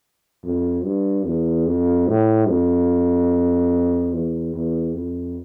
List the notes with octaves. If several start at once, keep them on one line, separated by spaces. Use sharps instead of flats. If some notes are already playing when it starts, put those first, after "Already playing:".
F2
G2
E2
F2
A2
F2
E2
E2
F2